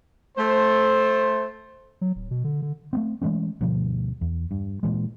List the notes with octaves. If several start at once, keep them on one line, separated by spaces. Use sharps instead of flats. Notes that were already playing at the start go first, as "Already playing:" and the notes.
A3 C5
F#3
D1
B2
D3
D3
A3 B3 C4
E3 G#3 A3 C#4
D2 G2 B2 F3
E2
G2
A#2 E3 G#3